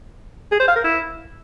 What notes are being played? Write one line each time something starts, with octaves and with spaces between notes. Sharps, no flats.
G#4
C5
F5
A#4
E4